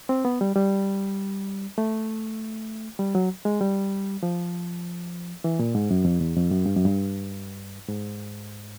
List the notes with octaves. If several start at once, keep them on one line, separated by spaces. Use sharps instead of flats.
C4
B3
G3
G3
A3
G3
F#3
G#3
G3
F3
E3
A#2
G#2
F#2
F2
E2
F2
F#2
G2
F#2
G2
G#2